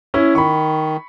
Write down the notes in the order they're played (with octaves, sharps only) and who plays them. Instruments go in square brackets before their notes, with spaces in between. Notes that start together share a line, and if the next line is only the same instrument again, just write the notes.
[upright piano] C#4 E4
[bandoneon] D#3 [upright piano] B5 C#6